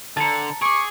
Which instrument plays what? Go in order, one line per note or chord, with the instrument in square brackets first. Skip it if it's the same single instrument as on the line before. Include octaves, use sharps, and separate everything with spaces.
[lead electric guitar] D3 [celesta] A5 A#5 [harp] A6 C#7
[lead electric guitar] G#4 [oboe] C#6 [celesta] D6 D7